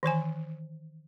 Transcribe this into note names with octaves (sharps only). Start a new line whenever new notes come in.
D#3 E3 C5 G#5